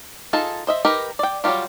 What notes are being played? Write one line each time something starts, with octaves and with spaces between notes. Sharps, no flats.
D#4 F4 G#4 A4 A5
C5 D#5 E5
D#4 G4 A#4 B4
D5 G5
F#3 G3 A3 F4 G4